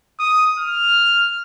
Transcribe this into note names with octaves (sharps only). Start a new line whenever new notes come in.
D#6
F6